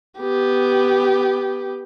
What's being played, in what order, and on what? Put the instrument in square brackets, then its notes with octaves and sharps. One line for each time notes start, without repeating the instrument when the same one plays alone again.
[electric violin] B3 G4